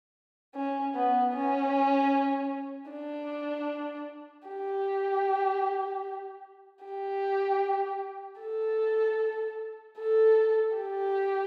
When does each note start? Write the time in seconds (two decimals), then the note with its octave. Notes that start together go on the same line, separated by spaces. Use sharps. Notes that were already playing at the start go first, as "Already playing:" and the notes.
0.55 C#4
0.95 B3
1.34 C#4
2.91 D4
4.48 G4
6.85 G4
8.41 A4
9.99 A4
10.77 G4